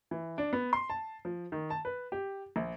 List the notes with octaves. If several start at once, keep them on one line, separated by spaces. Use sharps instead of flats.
E3
D4
B3
C6
A5
F3
D#3
A5
B4
G4
A#1